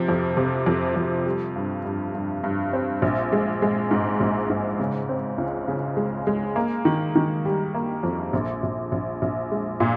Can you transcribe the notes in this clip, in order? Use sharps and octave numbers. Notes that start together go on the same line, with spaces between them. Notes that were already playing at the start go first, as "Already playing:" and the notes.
Already playing: C3 F3
F2
C3
F2
F2
G3
G2
G2
G2
G2
C4
A#1
G#3
G#3
G#2
A#1
G#2
C#3
C4
C#2
C#3
G#3
G#3
A#3
D#3
D#3
G3
A#3
F2
A#1
A#1
A#1
A#1
G#3
A#2